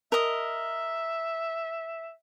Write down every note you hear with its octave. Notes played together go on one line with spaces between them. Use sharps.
A#4 D#5 E5